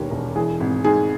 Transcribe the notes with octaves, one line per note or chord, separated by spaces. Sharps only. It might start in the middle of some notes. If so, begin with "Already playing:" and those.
Already playing: E1 D#2 D#3 G4 A#4 B4 C#5
E1
E3 G#4
G#1
G#2 G#4